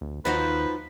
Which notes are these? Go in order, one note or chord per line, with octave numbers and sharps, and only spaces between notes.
D2
D#2 F3 D#4 F#4 B4